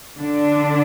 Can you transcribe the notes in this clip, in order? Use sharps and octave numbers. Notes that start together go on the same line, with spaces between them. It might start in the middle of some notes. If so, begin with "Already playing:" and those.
D3 D4